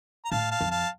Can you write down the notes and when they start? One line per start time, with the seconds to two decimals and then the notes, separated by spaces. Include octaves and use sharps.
0.25 A#5
0.31 A2 F5 A5
0.51 F5 A5
0.61 F2
0.71 F5 A5